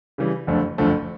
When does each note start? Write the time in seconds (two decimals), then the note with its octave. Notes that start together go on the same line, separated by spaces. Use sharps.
0.18 C#3 E3 G3
0.47 F#1 F2 D3 F3 A3
0.78 F#1 F2 D3 F3 A3